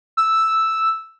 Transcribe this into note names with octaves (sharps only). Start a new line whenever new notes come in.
E6